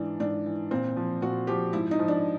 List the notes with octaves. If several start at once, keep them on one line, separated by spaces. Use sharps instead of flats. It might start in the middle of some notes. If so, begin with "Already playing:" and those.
Already playing: G#2 E3 D4
G#2 D4
E3
A#2 C4
F3
A#2 F#4
F3 G4
G#2 E4
D#4
F3
D4